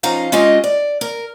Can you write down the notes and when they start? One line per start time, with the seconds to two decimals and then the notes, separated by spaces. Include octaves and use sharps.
0.03 F3 C#4 D#4 F5 A#5
0.32 G#3 C#4 F4 G4 D#5
0.64 D5
1.01 A#4